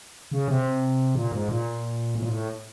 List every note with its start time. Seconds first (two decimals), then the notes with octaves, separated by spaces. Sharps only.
0.31 C#3
0.48 C3
1.15 A#2
1.32 G#2
1.49 A#2
2.15 A2
2.22 A#2
2.29 A2